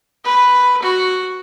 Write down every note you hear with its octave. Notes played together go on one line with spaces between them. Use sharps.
B4
F#4